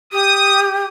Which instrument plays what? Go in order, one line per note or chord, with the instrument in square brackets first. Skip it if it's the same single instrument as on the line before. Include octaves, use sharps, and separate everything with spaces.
[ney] G4 [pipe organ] D#6